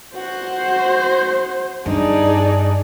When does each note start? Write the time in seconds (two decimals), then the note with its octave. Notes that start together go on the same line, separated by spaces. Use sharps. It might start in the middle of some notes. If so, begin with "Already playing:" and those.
0.15 F#4 C5 F#5
1.86 G2 D4 D#4 G#4 D5